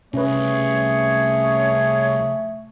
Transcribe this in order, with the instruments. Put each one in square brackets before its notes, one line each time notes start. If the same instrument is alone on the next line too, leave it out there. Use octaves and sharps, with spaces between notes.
[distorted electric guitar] C2 [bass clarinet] A3 [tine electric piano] C#4 B4 [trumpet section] G#4 C#5